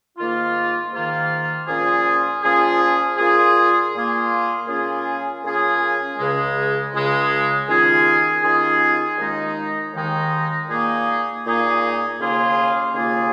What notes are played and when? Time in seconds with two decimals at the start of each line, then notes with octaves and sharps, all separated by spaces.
0.18 G#2 D#3 A#3 F4
0.92 G#2 D#3 A#3 F4
1.67 A#2 F3 C#4 F4 G#4
2.43 A#2 F3 C#4 F4 G#4
3.17 A#2 A#3 F4 G#4
3.93 A#2 A#3 F4 G#4
4.67 C#3 A#3 C#4 F4 G#4
5.43 C#3 A#3 C#4 F4 G#4
6.18 C#2 C#3 G#3
6.93 C#2 C#3 G#3
7.68 D#2 D#3 C#4 F4 G#4
8.43 D#2 D#3 C#4 F4 G#4
9.17 D#2 D#3 G#3 D#4
9.93 D#2 D#3 G#3 D#4
10.67 A#2 A#3 D#4 G#4
11.43 A#2 A#3 D#4 G#4
12.17 D#2 C#3 A#3 F4 G#4
12.93 D#2 C#3 A#3 F4 G#4